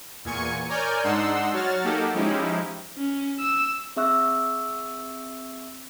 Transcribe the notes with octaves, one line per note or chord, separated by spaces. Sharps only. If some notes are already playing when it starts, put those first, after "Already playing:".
E2 A#2 G#5 C#6 G#6 C#7
A#4 C#5 D5 G#5 F6 G6
G#2 D4 D#4 F#5 C6 E6
F#3 F#4 C#5 F6 A6
A#3 D#4 F#4 G4 A4
F3 G#3 C#4 D#4 E4 G4
C#4
E6
C4 G#4 E5 C#6 E6 F#6